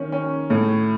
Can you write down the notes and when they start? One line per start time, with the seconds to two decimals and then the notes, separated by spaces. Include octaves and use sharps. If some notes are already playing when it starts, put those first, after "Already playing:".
Already playing: D#3 C#4
0.12 C#4
0.50 A2